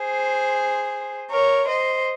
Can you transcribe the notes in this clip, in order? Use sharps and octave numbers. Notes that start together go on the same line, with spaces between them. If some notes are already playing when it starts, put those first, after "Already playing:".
Already playing: G#4 C5
A#4 C#5
C5 D#5